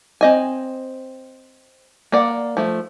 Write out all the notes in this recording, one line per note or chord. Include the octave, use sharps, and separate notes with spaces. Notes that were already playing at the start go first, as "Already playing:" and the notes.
C4 D#5 G#5
A#3 D5 F#5
F3 A3